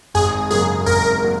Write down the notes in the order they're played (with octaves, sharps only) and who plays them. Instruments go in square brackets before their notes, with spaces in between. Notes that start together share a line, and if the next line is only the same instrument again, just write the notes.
[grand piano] G#1 [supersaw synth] G#4
[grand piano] F#2 C#3 F#3 A#3 [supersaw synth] G#4
[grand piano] G#1 [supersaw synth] A#4
[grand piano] F#3 A#3